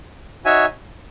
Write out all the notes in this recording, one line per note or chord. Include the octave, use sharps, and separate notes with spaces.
D#4 F#4 C#5 E5 G#5